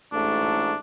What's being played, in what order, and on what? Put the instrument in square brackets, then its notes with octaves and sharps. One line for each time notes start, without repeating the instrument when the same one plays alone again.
[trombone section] A1 G#2 A3 [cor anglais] D4